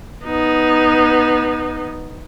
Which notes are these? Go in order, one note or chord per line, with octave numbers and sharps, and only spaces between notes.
B3 D#4